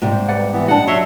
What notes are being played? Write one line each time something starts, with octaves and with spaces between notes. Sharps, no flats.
G#2 C3 G3
B4 D5 F#5
E3 B3
G3 D4 D#5 F#5 A5
F#3 C#5 E5 C6